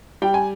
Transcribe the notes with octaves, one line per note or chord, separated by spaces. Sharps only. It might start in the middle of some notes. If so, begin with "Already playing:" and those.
G3 G5
G#5